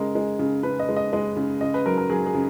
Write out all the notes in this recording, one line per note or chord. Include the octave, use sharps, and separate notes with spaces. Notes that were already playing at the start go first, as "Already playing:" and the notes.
Already playing: C#3 G#3 A#4
G#3
C#3
C#3 B4
D#5
G#3
D#5
G#3 D#5
C#3
C#3 D#5
B4
F#3 A#4
A#4
F#3 G#4
G#4
C#3